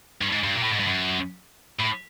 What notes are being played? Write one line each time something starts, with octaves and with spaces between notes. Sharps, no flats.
G2
G#2
G2
A#2
A2
G#2
G2
F#2
A2